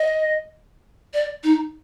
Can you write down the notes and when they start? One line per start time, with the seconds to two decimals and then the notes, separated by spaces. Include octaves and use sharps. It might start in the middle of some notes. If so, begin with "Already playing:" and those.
Already playing: D#5
1.14 D5
1.44 D#4